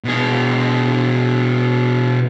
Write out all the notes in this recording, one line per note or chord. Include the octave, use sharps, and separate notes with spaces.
B2 G#4